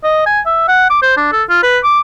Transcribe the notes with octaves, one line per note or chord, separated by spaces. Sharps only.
D#5
G#5
E5
F#5
D6
C5
D4
A4
F4
B4
D6